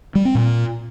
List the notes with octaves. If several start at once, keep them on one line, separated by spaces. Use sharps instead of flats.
G3
C4
A#2